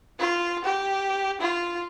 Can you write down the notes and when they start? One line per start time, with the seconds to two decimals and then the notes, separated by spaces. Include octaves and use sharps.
0.19 F4
0.64 G4
1.41 F4